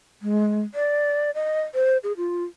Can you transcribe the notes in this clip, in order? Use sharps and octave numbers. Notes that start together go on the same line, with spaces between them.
G#3
D5
D#5
C5
G#4
F4